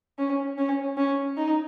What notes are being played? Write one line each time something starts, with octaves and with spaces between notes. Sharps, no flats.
C#4
C#4
C#4
D#4